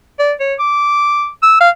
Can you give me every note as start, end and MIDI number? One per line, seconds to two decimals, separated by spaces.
0.19 0.33 74
0.40 0.54 73
0.59 1.28 86
1.43 1.58 88
1.60 1.70 77